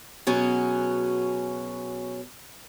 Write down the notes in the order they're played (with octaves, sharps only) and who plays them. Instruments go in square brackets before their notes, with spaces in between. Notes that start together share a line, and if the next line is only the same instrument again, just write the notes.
[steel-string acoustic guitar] B2 F#3 C#4 G#4